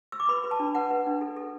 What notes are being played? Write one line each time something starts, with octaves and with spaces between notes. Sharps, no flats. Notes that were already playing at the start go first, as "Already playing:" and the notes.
E6
D6
B4 B5
B4
A5
D4
B4 F#5
B4
D4
A4
A4